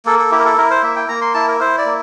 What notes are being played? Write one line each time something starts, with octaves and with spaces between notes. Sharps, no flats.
A#3 A4
A4
E4 G4
A#4
A4
E4 A#4
C5
A#3 E5
G5
A#3 A#5
C6
E4 A5
A#4
E4 C5
D5
A#3